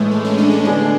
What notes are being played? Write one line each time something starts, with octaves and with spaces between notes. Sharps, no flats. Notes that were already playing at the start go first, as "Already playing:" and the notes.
Already playing: A2 E3 G#3 A3 B3
A3
C#4
D4
D4
D3 G#3 B3 D4